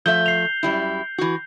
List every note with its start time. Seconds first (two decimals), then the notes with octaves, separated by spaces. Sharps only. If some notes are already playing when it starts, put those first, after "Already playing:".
0.06 F3 A3 E5 G6 G7
0.26 C7 F7
0.63 F#2 G3 E4
1.18 E3 F#4